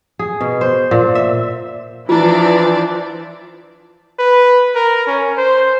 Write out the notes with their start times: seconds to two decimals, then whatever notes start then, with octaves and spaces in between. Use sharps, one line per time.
0.19 G#4
0.41 B2
0.61 C5
0.91 A#2
1.15 E5
2.09 E3 F3 D4 E4 F4 D5
4.19 B4
4.75 A#4
5.07 C#4
5.37 C5